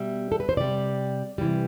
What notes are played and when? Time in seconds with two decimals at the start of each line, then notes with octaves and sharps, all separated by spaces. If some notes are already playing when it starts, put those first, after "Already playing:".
Already playing: B2 G3 E5
0.32 A4
0.40 B4
0.49 C5
0.56 C3 G3 D5
1.38 C3 E3 G3